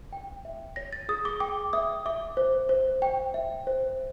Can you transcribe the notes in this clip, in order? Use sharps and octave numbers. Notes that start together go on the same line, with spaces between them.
G5
E5
C#5 A#6
A6
G#4 D#6
D6
G5 D6
E5 D#6
E5 D6
C5
C5
G5
E5
C5